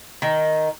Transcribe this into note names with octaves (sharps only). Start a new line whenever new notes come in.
D#3